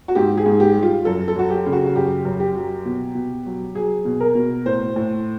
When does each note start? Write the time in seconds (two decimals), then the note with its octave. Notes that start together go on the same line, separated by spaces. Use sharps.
0.08 F#4
0.15 G#2 G4
0.37 G#4
0.46 G#2
0.60 G4
0.75 G3
0.83 F4
1.05 F#2 A4
1.28 A4
1.36 F#3 F#4
1.50 G4
1.66 C#3
1.73 F#4
1.86 F#4
1.95 F#2 G4
2.25 F#2
2.40 G4
2.56 F#3
2.85 B2
3.15 B2
3.46 F#3
3.75 F#3 G#4
4.05 B2
4.20 A#4
4.35 B2
4.65 A2 C5
4.96 A2